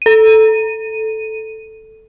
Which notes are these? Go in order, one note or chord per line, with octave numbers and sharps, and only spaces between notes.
A4 D#7